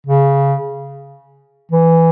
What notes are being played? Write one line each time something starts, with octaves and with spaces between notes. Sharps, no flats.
C#3
E3